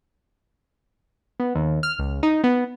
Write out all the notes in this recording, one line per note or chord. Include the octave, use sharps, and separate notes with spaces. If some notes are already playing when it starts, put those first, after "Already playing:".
B3
D#2
F6
C#2
D#4
B3